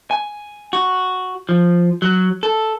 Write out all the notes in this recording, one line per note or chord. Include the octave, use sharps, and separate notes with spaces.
G#5
F#4
F3
F#3
A4